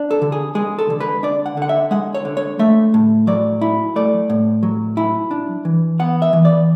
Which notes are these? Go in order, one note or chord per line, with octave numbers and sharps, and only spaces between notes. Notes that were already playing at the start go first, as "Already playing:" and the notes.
Already playing: D4
A4
D3
G#4
G#3 G#4
A4
D3
B4
D4 D5
F#5
D3 F#5
E5
G#3 F#5
C#5
D3
C#5
A3 E5
A2
F#3 D5
E4
A3 D5
A2
F#3
E4
D4
E3
B3 F#5
E5
E3
D5